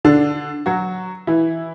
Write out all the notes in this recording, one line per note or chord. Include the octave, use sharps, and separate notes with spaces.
D3 D4
F#3 F#4
E3 E4